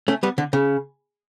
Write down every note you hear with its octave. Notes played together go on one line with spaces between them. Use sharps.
A3 C#4
G3 B3
D3
C#3